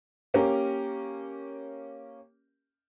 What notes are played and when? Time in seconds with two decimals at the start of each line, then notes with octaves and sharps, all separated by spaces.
0.34 A#3 C#4 G4 A#4